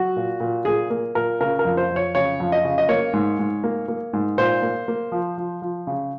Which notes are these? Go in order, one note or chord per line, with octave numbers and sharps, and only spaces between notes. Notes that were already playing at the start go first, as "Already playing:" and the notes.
Already playing: F#3 F#4
A#2
A#2
A#2 G#4
A#3
A#2 A#4
C#3 A#4
A#4
F2
C5
F2
C#5
C#3 C#5
F2
D#5
C#3
D#5
A#3 C#5
G#2
G#2
A#3
A#3
G#2
A#2 C5
A#3
A#3
F3
F3
F3
C#3